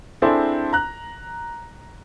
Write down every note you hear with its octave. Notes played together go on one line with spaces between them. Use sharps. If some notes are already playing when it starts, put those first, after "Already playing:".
C4 D4 E4 G#4 A4 C5
A#5 F#6